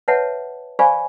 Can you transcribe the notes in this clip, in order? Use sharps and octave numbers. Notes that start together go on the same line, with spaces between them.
B4 C#5 E5 F#5 A5
C5 D5 F5 G#5 B5 C#6